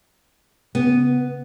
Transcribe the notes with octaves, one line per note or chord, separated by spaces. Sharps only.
C#3 B3